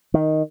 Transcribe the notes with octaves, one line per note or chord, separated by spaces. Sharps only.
D#3